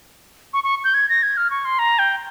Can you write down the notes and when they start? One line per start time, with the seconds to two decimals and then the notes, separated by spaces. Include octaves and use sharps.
0.53 C#6
0.64 C#6
0.84 G6
0.94 G#6
1.09 A#6
1.23 G#6
1.37 F6
1.50 C#6
1.65 C6
1.79 A#5
1.99 G5